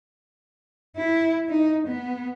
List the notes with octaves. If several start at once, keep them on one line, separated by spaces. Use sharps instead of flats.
E4
D#4
B3